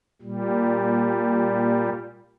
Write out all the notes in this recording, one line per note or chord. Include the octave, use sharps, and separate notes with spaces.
A#2 G3